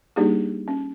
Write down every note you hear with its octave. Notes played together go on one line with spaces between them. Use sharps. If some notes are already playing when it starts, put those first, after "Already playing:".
G3 A#3 D4 D#4 G4 G#4
C#4